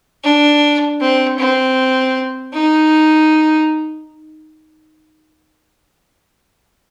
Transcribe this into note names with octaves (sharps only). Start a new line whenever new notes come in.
D4
C4
C4
D#4